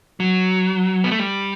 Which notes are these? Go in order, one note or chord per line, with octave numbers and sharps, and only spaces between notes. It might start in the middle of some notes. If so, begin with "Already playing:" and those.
F#3
B3
A3
G3